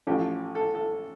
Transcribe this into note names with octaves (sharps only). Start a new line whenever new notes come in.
A1 A2 F3 G4
A4
A4